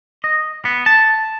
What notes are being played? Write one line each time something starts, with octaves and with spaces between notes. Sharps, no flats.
D#5
B3
A5